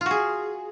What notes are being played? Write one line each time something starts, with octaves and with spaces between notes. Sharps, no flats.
F4 F#4 G#4